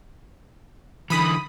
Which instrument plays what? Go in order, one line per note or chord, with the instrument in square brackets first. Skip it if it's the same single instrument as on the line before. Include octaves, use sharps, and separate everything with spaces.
[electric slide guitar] D3 E3 [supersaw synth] B5 D#6